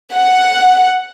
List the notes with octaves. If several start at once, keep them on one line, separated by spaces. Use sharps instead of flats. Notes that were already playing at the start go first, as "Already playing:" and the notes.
F#5